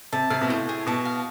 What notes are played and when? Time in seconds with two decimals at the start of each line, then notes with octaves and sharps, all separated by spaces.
0.13 C3 A5
0.30 C3 F5
0.41 B2
0.49 A2 C5
0.69 G#4
0.87 B2 A5
1.05 F5